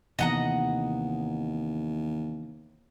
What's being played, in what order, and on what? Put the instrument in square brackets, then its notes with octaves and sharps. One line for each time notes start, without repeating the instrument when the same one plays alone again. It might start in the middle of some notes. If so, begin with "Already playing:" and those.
[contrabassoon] D#2 [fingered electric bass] C3 E3 B3 [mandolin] D#5 F#5 A#5